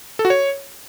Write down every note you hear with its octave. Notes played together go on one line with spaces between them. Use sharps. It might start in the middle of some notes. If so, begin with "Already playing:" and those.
A4
F#4
C#5